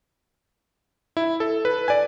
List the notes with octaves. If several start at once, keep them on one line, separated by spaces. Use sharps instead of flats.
E4
A4
B4
D5 G#5